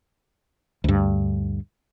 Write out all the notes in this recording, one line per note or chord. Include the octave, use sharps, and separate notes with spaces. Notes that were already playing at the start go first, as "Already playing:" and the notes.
D2 G2